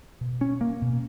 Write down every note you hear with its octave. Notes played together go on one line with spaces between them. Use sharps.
B2
C#4
A#3
B2